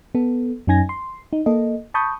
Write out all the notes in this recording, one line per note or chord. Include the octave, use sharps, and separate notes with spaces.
B3 A4
F#2 C#4 D#4 G#5 G#6 A#6
C6
D#4
A#3 A4 D#5
A5 B5 C#6 D#6 G6